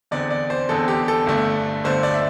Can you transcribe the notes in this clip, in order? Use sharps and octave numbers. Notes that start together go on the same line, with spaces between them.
E2 D3 C4 D5
D5
C5
E2 D3 C4 A4
G4
A4
G1 G2 D3 A3
G1 G2 D3 A3 C5
D5
E5